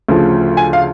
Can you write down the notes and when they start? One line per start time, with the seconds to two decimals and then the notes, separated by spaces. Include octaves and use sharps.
0.09 D2 C#3 F3
0.57 G#5
0.73 F5